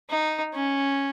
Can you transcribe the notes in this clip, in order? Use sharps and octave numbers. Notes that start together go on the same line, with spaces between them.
D#4
C#4